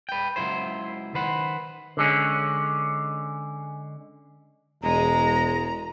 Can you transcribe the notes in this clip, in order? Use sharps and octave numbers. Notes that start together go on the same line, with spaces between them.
B4 G5
C#2 G2 F#3 E4 C5
D#3 B4 C5 F#5
D3 G#3 C#4
E1 G#3 A#5